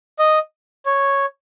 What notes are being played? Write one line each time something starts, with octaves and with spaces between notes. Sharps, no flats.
D#5
C#5